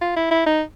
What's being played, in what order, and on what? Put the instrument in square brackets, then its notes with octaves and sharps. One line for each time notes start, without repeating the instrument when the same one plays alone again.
[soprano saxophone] F4
E4
E4
D#4